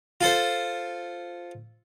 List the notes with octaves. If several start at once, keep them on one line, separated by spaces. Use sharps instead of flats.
F4 A4 C5